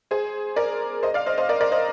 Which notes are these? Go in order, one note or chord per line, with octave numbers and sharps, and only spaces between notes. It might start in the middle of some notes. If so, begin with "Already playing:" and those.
G#4 C5
A#4 D5
C5 D#5
D5 F5
C5 D#5
C5 D#5
A#4 D5
A#4 D5
C5 D#5